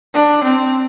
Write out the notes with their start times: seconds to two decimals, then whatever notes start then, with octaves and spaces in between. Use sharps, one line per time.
0.14 D4
0.44 C4